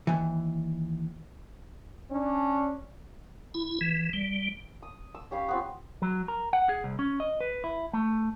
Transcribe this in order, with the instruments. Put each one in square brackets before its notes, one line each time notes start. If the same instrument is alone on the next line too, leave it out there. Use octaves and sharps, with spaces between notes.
[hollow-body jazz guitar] D#2 E3
[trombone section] C#4 D4
[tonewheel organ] E4
E3
G3
[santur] D#6
E6
C#4 G4 F5 B5
B3 C4 F4
[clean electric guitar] F#3
A#4
F#5
G#4
C2
C#4
D#5
B4
E4
A3